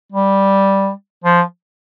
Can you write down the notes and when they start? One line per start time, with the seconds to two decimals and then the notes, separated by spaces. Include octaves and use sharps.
0.12 G3
1.24 F3